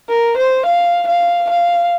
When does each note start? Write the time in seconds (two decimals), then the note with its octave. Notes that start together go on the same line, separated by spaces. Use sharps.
0.09 A#4
0.37 C5
0.66 F5
1.07 F5
1.49 F5